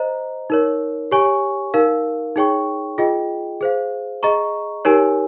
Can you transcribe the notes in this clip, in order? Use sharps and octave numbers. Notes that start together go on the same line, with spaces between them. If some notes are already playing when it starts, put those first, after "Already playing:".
Already playing: C5 D#5 A#5
D#4 A#4 C#5
G4 C#5 G#5 C#6
D#4 A#4 F5
D#4 G#4 C#5 G5 C#6
F4 G#4 D#5 G5
G#4 C5 F5
G#4 D#5 A#5 C#6
D#4 G4 A#4 C#5 G#5